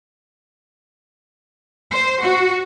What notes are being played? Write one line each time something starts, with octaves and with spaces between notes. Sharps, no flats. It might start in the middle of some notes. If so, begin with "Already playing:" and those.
C5
F#4